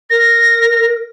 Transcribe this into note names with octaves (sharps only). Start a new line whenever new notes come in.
A#4 A#6